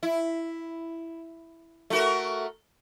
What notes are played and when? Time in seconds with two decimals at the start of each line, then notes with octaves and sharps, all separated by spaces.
0.03 E4
1.90 A3 F#4 A#4